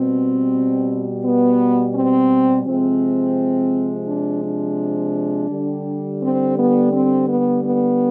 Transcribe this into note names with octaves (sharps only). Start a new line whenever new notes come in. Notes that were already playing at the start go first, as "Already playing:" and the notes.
Already playing: B2 G3 C4
B3
C4
C3 F3 G#3 C4
D4
D4
D3 G3
C4
B3
C4
B3
B3